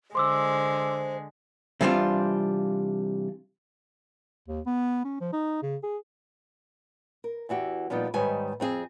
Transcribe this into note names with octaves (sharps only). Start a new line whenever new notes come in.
D3 G#3 C5 C6 D6 E6
C3 E3 G3 C4 D4 F4
D#2
B3
C#4
F3
D#4
C#3
G#4
A#4
E2 E3 F#4 G4
A#2 F3 G3 B3 D#4
G#2 D#3 G3 B4 C#5 G#5
F2 C4 F4 G#4